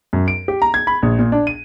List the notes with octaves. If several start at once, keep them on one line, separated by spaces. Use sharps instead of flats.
F#2
D7
G4
A#5
G#6
B5
A#1
A#2
D4
D#7